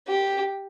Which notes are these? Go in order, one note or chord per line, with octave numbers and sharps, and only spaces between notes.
G4